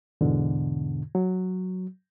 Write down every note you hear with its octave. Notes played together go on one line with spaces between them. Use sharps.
E2 G#2 B2 D3
F#3